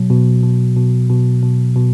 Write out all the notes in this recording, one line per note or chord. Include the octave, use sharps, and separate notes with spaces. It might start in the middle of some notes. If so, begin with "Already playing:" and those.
Already playing: B2 F#3
B2
B2
B2
B2
B2
B2